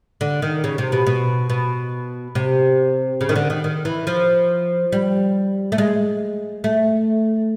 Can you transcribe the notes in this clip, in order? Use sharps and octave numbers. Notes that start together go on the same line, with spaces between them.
D3
D#3
C#3
C3
B2
B2
B2
C3
C#3
D#3
D3
D#3
D#3
E3
F3
G3
A3
G#3
A3